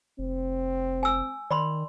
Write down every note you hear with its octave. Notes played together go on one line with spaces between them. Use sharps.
F1 C4
G#5 E6
D#3 D5 B5 C6